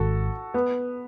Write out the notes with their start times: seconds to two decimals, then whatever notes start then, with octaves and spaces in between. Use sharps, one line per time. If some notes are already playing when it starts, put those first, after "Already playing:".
Already playing: G#1 G#2 D#3 F#4 A4
0.54 B3